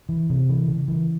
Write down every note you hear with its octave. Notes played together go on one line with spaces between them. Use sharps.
E3
C3
E3
C#3
E3